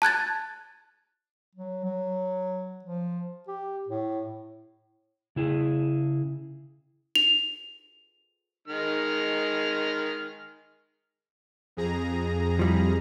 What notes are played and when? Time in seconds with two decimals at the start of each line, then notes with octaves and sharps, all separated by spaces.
0.02 A5 F#6 G#6 A6
1.55 F#3
1.84 F#3
2.84 F3
3.48 G4
3.88 A2
5.36 C#3 E4 G#4
7.15 F7
8.68 D#3 G#3 F6
11.77 F2 G#4 A#5
12.59 F3 G3 E4